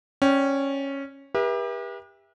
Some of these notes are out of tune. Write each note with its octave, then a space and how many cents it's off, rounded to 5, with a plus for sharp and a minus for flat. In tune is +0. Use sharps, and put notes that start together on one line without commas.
C#4 -10 D5 -20 G5 +0
G4 +30 B4 -45 E5 +0